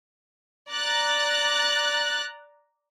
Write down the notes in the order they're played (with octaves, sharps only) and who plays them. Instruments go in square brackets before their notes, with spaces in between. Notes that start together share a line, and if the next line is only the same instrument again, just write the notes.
[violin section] D5 A#5 F#6 A6